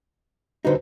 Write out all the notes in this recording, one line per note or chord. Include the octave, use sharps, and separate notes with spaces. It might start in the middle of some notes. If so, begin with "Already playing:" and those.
D3 G3 D#4 F#4 B4 C5